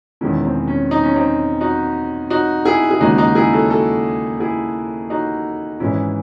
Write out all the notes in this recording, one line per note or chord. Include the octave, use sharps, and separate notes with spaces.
E1 E2 D#3 G#3 C#4 E4
C4
C#4
D#4
C#4
C4 D#4
D#4 F#4
D#4 F#4
E4 G#4
G#4
D#2 C#3 G#3 D#4 F#4
D#4 F#4
E4 G#4
F#4 A4
F#4 A4
E4 G#4
D#4 F#4
G#1 G#2 E3 G#3 C#4 E4